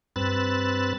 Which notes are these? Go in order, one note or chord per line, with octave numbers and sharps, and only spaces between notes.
G2 C4 B4 E6 F#6 A6